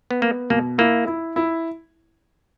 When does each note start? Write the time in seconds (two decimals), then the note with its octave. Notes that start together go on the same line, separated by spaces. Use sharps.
0.11 B3
0.22 A#3 B3
0.50 B2 A#3
0.78 A#3 E4
1.07 E4
1.36 E4